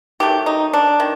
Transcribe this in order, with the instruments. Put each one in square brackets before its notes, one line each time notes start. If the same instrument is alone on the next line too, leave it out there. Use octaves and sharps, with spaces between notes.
[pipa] D#3 F#3 A3 G4
D#4
D4
D#3